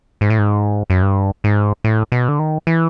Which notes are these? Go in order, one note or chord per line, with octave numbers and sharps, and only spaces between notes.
G#2
A2
G#2
F#2
G2
G#2
A2
B2
D3
D#3
E3